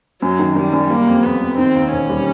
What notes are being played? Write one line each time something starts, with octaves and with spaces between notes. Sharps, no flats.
F#2 F#3
D#3
D#3 G3
F#2
G3 A#3
F2
F2 B3
F2
D#3 C4
D#2
E1 C#4
G3